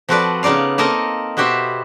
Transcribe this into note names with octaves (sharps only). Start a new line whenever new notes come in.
F3 C4 F#4 A4 B4 D5
C#3 B3 D#4 D5 F5
A#3 C4 D#4 A4 A#4 D#5
B2 B3 F#4 G4 C5 E5